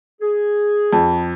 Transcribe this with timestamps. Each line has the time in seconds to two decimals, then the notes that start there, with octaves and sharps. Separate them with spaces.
0.21 G#4
0.93 F2